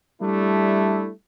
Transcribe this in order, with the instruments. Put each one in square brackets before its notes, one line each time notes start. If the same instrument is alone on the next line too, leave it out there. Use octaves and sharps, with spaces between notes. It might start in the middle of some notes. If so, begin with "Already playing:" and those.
[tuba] G3 [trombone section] A3 D4 E4